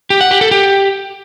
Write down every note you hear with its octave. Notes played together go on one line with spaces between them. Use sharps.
G4
F#5
G4
A4
G4